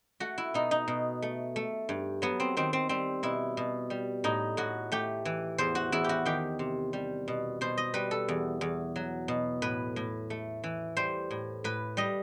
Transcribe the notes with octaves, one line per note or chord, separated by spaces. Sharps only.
A3 F#4
E4
B2 D#4
D#4
B2
A3
A3
G2
F#3 B3
C4
D#3 C4
C4
G3 C4
B2 E4
B2
G3
A2 D#4
A2 F#4
A3 G4
E3
E2 C5
F#4
E2 E4
F#4 G4
D#3 G4
C3
G3
B2
B2 C5
D#5
G3 B4
A4
E2
E2
F#3
B2
A2 B4
A2
A3
E3
G3 C5
A2
A2 B4
G3 D#5